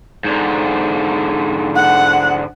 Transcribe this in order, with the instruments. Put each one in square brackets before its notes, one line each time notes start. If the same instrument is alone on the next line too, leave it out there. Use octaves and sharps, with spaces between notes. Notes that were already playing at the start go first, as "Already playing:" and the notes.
[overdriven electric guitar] G#2 D3
[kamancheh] F#5